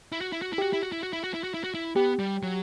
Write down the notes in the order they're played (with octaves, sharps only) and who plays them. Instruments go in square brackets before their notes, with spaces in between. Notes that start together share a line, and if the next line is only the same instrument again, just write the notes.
[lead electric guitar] E4
F#4
E4
F#4
E4
[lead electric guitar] F#4 [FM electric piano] G4
[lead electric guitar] E4
F#4
E4
F#4
E4
F#4
E4
F#4
E4
F#4
E4
[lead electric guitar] B3 [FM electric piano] G4
[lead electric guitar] G3
F#3